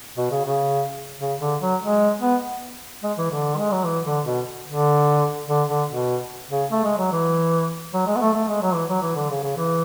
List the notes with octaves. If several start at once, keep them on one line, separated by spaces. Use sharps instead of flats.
B2
C#3
C#3
C#3
D3
F#3
G#3
B3
G#3
E3
D3
G#3
F#3
E3
D3
B2
D3
D3
D3
B2
C#3
A3
G#3
F#3
E3
F#3
G#3
B3
A3
A3
G#3
F#3
E3
F#3
E3
D3
C#3
C#3
E3